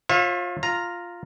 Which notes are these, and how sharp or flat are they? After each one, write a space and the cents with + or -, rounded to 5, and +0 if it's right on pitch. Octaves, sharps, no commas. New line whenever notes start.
F4 +20 C#5 -45 E5 +0
F4 +0 A#5 +0